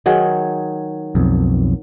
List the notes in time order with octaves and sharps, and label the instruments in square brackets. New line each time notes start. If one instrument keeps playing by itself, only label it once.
[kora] D#3 F#3 G#4
[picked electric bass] B1 F2